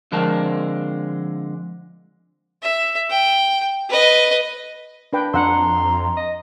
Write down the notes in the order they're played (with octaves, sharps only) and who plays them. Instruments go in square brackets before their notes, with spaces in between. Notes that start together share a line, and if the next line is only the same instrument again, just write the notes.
[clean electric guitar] D3 F3 G#3 C4 A#4 A5
[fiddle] E5
G5
B4 D#5
[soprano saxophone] A#3 [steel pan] D4 B4 G5
[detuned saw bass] F2 [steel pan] D4 F#5 E6 [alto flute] A#5 [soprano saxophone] C6
[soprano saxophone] D#5